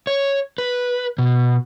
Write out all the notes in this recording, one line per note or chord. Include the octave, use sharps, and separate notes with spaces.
C#5
B4
B2